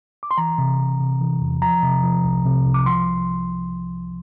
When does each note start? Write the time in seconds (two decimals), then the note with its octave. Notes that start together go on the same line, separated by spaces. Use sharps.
0.23 D6
0.31 C6
0.37 E3 A#5
0.58 C3
0.79 C3
1.00 C3
1.21 E3
1.41 E2
1.62 F3 A#5
1.83 C3
2.03 F3
2.25 C2
2.45 C3
2.66 C2
2.74 D6
2.86 F3 C6